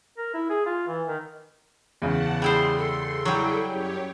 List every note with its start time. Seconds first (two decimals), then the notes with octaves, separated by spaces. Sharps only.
0.18 A#4
0.34 E4
0.50 G#4
0.66 F4
0.88 E3
1.07 D#3
2.02 E2 C#3 F#5 A5
2.42 G3 E4 G#4 C5 C6
2.78 A4
3.25 F#3 G3 E4 G#4 G5
3.67 F#2 G4 C#5